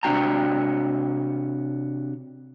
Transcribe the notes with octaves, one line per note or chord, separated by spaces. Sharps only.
C3 D4 F#4 G5 A#5